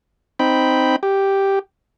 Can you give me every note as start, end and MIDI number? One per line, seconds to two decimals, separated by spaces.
0.39 0.96 60
0.39 0.96 63
0.39 0.96 79
0.39 0.96 83
1.03 1.59 67